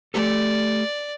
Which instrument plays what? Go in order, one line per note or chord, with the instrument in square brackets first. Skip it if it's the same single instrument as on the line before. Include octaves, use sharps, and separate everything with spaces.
[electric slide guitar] A3 G4 A4 [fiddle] D5